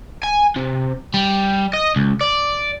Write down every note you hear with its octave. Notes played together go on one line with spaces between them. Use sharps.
G#5
C3
G3
D#5
C#2
D5